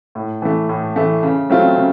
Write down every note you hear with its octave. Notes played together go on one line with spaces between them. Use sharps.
A2
E3 A3
A2
E3 A3
C#3
F#3 A3 C4 F4
C#3